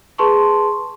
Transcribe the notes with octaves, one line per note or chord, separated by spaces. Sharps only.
G#4 B4 A5 C6 C#6